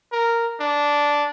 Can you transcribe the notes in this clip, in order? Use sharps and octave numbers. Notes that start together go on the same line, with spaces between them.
A#4
D4